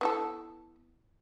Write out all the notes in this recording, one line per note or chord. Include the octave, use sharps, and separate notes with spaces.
B3 E4 A4